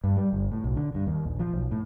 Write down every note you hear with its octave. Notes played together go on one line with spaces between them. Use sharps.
G2
G3
G1
A2
B1
D3
G2
D#2
A#1
F3
B1
A2